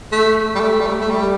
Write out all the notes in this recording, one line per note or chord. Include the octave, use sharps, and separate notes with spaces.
A3
G3
A3
G3
A3
A3
G3